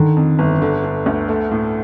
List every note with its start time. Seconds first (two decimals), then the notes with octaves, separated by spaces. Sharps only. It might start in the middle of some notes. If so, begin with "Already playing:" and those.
Already playing: D3 D#3
0.17 F2
0.39 G1
0.62 D3
0.84 D3
1.06 D2
1.28 A3
1.51 A2